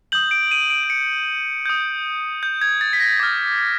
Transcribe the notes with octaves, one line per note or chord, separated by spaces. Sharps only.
D#6 G6 F#7
D7
D#7
D7
D7
C#7
D#6 G6
G6
G#6
A6
B6
A#6
D6 F6 A6